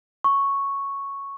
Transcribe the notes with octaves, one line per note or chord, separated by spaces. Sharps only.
C#6